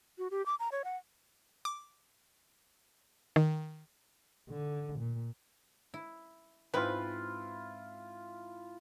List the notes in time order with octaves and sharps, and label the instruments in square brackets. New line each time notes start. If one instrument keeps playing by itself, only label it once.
[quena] F#4
G4
D6
A#5
C#5
F#5
[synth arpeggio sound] D6
D#3
[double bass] D3
A#2
[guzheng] E4
[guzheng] G#2 C4 [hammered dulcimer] E4 F4 [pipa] B4